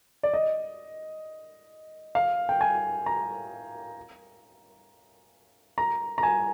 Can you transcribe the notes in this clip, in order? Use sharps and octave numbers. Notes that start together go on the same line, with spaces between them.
D5
D#5
F5
G5
G#5
A#5
A#5
A#5
G#5